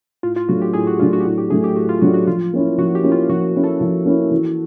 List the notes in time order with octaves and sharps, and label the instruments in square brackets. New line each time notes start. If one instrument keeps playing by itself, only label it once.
[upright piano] A2 [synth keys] F4
[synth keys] F4
[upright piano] F#3 A3 D4 [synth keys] F#4
[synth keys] G4
[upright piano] A2 [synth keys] G#4
[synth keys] F#4
[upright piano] F#3 A3 D4 [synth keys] F4
[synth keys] F#4
G4
[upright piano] A2 [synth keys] F#4
[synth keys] G4
[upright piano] F#3 A3 D4 [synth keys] G#4
[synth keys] G4
[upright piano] A2 [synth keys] F#4
[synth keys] F4
[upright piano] F#3 A3 D4 [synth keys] F#4
[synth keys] F#4
[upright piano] F3 [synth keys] F4
[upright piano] A#3 C#4 E4
[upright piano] F3 [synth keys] F#4
[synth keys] G4
[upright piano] A#3 C#4 E4
[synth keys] F4
[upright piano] F3 [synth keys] F#4
[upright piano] A#3 C#4 E4
[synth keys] A4
[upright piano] F3
A#3 C#4 E4
E3